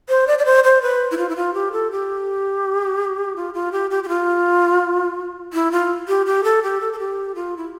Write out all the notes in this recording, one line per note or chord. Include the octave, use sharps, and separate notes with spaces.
C5
D5
D5
C5
C5
B4
E4
F4
E4
F4
G4
A4
G4
F4
F4
G4
G4
G4
F4
E4
F4
G4
G4
A4
G4
A4
A4
G4
F4
E4